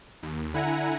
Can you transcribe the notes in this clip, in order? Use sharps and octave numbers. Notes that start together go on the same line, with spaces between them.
D#2
D3 E4 F#5 G#5 A#5